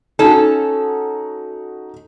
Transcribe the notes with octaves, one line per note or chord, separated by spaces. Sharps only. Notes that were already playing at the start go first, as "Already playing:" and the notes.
C#4 D#4 F#4 A4